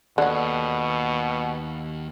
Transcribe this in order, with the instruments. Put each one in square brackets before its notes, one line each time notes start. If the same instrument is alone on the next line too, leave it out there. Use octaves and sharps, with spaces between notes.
[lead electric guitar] D#2 [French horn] B2 [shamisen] D3 F#5